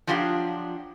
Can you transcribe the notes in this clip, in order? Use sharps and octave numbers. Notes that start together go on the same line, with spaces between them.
F3 F#3 D4 F4 G4